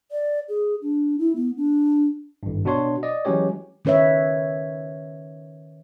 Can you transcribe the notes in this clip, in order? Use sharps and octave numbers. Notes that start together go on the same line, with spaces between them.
D5
G#4
D4
E4
B3
D4
G#1 G2
B2 D4 F#4 C#5 C6
D5 D#5
E3 F#3 G#3 C#4 G4 C#5
D#3 C#4 B4 C#5 E5